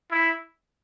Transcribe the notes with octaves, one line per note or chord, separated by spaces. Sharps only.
E4